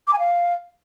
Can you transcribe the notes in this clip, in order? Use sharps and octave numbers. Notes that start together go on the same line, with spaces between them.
D6
G#5
F5